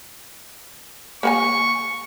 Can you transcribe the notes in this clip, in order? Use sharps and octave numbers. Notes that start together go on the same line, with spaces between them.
A#3 B4 G#5 C#6